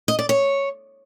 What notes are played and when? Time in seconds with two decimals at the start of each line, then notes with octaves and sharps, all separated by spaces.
0.08 D#5
0.19 D5
0.29 C#5